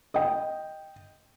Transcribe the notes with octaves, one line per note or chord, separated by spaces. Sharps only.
D#5 G5